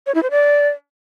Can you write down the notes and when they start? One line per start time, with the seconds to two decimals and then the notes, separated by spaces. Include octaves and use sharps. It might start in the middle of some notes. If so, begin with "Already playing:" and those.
0.06 C#5
0.15 E4
0.23 C5
0.31 D5